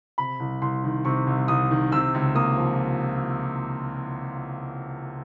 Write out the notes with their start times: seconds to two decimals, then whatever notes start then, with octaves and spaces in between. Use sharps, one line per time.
0.18 C3 B5
0.40 C2
0.62 C2 C6
0.84 D#3
1.05 C3 C#6
1.27 C2
1.48 C2 D#6
1.71 D#3
1.92 C3 E6
2.14 C#2
2.35 A#3 D#6
2.57 F3